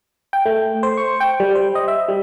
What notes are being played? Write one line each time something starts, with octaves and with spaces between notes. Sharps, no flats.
G5
A3
C5
C#6
G5
G3
C5
D#5
E5
G3